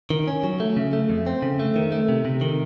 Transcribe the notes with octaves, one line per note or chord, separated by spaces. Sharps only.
D#3
C#4
F#3
A3
C#3
A3
F2
C4
C#3
A3
D#3
A3
C3
C3
D#3